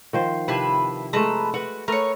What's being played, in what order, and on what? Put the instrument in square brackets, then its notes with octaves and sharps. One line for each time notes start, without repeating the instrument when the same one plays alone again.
[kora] D#3 F3 C5
[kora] C3 [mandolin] D4 E4 B4
[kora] G#3 A3 [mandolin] B4 A5 A#5
[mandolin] F#4 [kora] B4 F#5
[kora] A3 B4 [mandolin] A#4 C#5